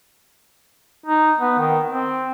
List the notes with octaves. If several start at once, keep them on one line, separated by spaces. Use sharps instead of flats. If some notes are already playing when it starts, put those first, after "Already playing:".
D#4
B3
D#3
C4